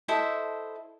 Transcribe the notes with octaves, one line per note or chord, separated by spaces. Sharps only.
E4 A4 C5 D#5